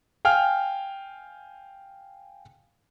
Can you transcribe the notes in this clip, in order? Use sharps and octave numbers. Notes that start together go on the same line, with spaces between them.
F5 G5 G#5 F6